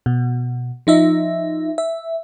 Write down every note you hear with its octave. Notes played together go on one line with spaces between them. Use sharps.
B2
F3 D#4 E5
E5